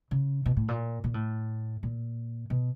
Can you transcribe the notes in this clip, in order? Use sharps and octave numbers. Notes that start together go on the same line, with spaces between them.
C#3
B2
A2
A#2
A#2
A2
A#2
B2